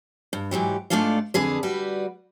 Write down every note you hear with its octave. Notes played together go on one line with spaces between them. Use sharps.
G2
G#2 E3 F#3 G4
G#2 A3 D4 F4 A4 F5
F2 D3 G#4 B4
G3 F#4 B4